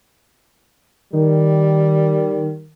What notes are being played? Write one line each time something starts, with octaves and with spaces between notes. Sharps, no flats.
D#3 G3